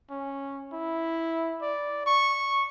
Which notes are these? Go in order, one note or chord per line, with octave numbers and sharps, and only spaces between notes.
C#4
E4
D5
C#6